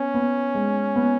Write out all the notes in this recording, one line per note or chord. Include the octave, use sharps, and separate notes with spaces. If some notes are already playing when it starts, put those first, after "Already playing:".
Already playing: B3 C#4
B3
G#3
B3